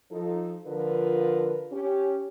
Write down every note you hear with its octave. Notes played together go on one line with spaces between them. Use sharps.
F3 D#4 A4
D3 F3 F4 A#4 B4
C#4 G4